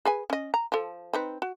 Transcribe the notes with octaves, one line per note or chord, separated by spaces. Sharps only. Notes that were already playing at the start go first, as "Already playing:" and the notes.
G#4 B4 G#5
C#4 D#5
A#5
F3 A4
C4 D#4 B4
F#4